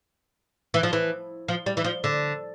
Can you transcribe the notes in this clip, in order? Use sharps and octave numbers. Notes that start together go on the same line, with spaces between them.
E3
F3
E3
F3
G3
E3
F3
D3